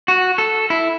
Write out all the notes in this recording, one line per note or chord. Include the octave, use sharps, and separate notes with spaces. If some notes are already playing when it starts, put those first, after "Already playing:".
F#4
A4
E4